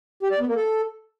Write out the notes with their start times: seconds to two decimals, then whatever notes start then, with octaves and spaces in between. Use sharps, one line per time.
0.23 G4
0.31 D5
0.40 B3
0.48 A#3
0.56 A4